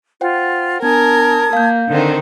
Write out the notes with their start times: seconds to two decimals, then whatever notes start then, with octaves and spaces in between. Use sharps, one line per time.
0.21 F4 C5 F#5 G5
0.82 B3 D4 A#4 G#5 A5 D#6 G#6
1.53 A#3 F5 G6
1.89 D3 D#3 C4